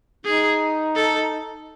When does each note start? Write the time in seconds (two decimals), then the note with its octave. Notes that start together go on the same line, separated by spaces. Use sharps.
0.25 D#4 G#4
0.96 A4